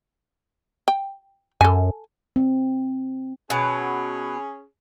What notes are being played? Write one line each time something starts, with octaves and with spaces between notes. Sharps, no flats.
G5
F#2 A4 G#5
C4
B2 F#3 C#4 G#4